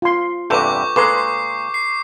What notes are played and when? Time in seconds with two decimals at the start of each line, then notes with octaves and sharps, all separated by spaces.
0.02 F4 C6
0.50 E2 G2 C3 A4 B4 C#6 D6 G6
0.96 A#2 G#3 A4 B4 C6 D6 C7
1.74 C7